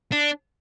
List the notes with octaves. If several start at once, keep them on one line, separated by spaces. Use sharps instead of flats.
D4